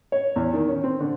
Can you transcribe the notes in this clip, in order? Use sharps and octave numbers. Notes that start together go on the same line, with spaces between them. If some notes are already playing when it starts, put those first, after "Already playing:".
C#5
E2
D#3
C#4
C4
D3